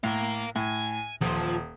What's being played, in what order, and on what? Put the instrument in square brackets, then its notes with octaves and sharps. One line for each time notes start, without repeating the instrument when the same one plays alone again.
[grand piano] A2 [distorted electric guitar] A#4 F5
[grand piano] A2 [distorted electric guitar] G#5
[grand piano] D#1 [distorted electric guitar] F3